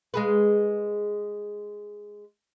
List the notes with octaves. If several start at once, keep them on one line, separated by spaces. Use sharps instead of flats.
G#3 G#4 B4